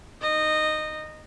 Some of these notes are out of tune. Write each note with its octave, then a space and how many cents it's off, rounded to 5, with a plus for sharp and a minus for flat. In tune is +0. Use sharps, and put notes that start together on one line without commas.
D#4 +0 D#5 -15